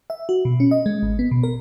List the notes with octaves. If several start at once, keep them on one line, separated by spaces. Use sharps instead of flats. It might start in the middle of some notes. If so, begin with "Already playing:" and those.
E5
F#4
B2
C#4
D#5
G#3
G#1
B3
B2
A#4